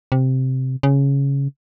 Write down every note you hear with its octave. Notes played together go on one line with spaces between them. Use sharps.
C3
C#3